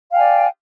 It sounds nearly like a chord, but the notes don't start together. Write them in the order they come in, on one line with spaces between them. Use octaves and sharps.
F5 G5 G#5 D5